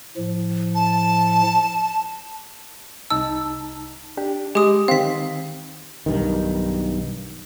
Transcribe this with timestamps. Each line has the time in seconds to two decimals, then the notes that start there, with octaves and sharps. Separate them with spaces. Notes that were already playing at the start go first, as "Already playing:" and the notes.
0.17 A2 F3
0.75 A5
3.10 C2 D#4 A5 E6
4.17 D4 G4
4.55 G#3 G4 D#6
4.88 D#3 C4 F5 B6
6.06 B1 G2 D#3